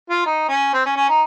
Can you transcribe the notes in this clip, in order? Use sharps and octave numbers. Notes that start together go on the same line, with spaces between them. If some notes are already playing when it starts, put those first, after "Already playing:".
F4
D#4
C#4
C4
C#4
C#4
D#4